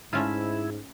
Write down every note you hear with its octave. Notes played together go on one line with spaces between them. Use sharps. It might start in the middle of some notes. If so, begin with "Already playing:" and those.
G#2 A3 C#4 E4 F4